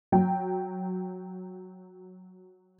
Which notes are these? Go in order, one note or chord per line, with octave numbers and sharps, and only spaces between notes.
F#3 G5